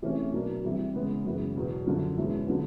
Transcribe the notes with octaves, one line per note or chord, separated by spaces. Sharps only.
C3 E3 A3 C#4
B2 F#3 A#3 D4
C3 E3 G3
C#3 E3 G#3 B3
F#2 C#3 E3 G#3 B3
E2 B2 F#3
F#2 D3 F3
E2 B2 G#3 C#4 E4
D3 F#3 B3